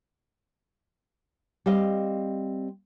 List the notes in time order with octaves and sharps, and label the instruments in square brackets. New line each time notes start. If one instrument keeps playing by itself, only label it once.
[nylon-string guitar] G3 C4 D#5 F5